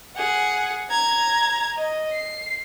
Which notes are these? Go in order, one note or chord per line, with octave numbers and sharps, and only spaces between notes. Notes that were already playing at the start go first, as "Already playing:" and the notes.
G#4 F#5
A#5 G#6
D#5
C7